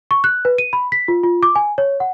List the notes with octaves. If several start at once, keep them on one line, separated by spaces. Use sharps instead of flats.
C#6
F#6
B4
D#7
B5
B6
F4
F4
D6
G#5
C#5
F#5